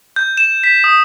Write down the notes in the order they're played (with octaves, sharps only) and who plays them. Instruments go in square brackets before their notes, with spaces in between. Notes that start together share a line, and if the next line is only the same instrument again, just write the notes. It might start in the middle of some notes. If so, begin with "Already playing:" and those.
[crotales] G6
E7
B6
D#6